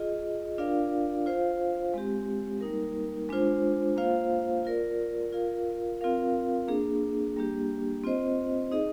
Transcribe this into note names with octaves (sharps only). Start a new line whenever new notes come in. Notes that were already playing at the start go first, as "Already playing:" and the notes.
Already playing: F4 G#4 D#5
D4 F4 A#4 D5 F5
F4 C5 F5
G#3 C4 G4
G3 A#3 D#4 A#4
G#3 D4 F4 C5
A#3 F4 C5 F5
F4 A#4 D5
F4 A#4 F5
C4 F4 A#4 F5
A#3 D4 G#4
G3 A#3 D4 G4
C4 F4 C5 D#5
D#4 G#4 D#5